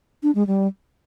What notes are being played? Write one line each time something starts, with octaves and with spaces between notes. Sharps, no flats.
D4
G#3
G3